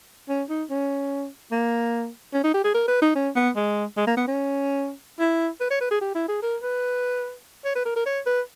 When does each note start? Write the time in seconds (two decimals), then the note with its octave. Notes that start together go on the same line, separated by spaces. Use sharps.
0.29 C#4
0.49 D#4
0.70 C#4
1.52 A#3
2.33 C#4
2.44 D#4
2.54 G4
2.64 G#4
2.74 A#4
2.88 B4
3.01 D#4
3.15 C#4
3.36 B3
3.56 G#3
3.97 G#3
4.07 A#3
4.17 B3
4.28 C#4
5.20 E4
5.61 B4
5.71 C#5
5.81 B4
5.91 G#4
6.01 G4
6.15 E4
6.29 G#4
6.43 A#4
6.63 B4
7.65 C#5
7.75 B4
7.85 A#4
7.96 A#4
8.06 C#5
8.26 B4